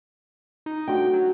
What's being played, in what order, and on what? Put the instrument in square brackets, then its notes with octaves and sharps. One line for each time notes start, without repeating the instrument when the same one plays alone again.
[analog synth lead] D#4
[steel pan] A3 D4 F#4 [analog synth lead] G5
[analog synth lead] F#3